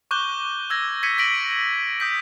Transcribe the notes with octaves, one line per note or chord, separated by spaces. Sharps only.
C#6 D6 F#6 G6 G7
E6 G#6 A#6
G#6 B6 C#7 D#7
A#6 B6 D7 F#7
D#6 G6 B6